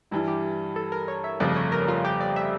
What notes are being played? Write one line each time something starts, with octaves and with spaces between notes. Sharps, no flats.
G2 E3 G3 E4
G4
A4
A#4
C#5
E5
G1 F2 C#3 F3 A3 D5
C#5
A#4
F4
G4
D5
E5